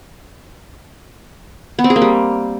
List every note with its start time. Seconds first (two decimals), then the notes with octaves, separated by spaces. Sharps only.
1.79 B3
1.84 C4
1.90 G#4
1.96 A#3
2.02 G3